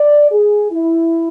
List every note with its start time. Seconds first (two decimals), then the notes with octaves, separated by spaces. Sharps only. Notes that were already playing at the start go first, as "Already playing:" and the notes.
Already playing: D5
0.31 G#4
0.71 E4